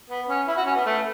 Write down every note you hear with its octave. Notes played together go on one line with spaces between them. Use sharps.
B3
C#4
E4
F#4
C#4
B3
A3